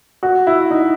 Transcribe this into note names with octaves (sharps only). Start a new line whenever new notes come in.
F#4
E4
D#4